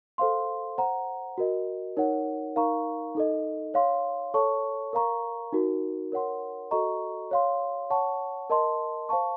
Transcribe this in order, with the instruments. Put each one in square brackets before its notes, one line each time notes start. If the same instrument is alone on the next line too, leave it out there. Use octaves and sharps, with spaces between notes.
[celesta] A4 C5 F5 C6
C5 F#5 A#5
F#4 A#4 D#5
D#4 A#4 C#5 F#5
D#4 A#4 F5 A#5 C#6
D#4 A4 D#5
C#5 F5 C6
A4 C#5 A5 C#6
A#4 F5 A#5 C#6
D#4 F#4 A#4
A#4 C#5 F#5 C6
F#4 A4 D#5 A#5 C#6
C#5 F5 C6
C#5 F#5 A5 C#6
A#4 D#5 A5 C6
C5 F5 A5 C#6